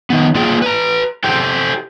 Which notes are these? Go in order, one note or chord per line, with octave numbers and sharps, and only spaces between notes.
D#3 B3
A#3 F4 G#4 D5 G5
B4 A#5
G4 A4 C5 G5